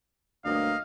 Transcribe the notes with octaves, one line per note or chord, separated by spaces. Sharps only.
D2 G2 F#3 A#3 D#5 F5